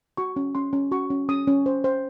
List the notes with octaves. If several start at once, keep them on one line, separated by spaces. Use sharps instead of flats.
F#4 C#6
C#4
C#4 C6
C#4
F#4 C#6
C#4
C#4 D#6
C#4
C5
C5